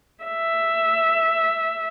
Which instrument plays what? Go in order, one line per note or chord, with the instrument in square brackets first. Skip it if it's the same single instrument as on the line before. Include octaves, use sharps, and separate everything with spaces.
[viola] E5